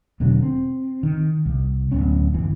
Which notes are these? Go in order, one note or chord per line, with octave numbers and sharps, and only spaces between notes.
E1 B2 D3 F#3
C4
D#3
C2
D1 G1 B3 C#4
G1 E3